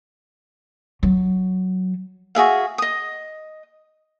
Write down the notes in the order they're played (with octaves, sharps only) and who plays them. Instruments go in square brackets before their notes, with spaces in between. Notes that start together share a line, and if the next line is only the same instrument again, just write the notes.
[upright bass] F#3
[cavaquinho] F#4 G#4 E5 F5
D#5 D#6